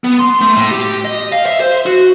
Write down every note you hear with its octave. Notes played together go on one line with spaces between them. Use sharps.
B3
C6
A3
A2
G4
D#5
F5
E5
C5
F#4